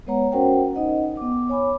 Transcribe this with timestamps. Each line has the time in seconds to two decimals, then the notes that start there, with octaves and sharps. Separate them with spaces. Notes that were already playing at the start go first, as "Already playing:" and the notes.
0.07 G#3 B3 B4 C#5 F#5 A#5
0.32 C#4 F#4 A#4 C5 F#5 G5
0.75 D#4 D#5 F#5
1.17 B3 D6
1.49 C#5 G#5 B5 D6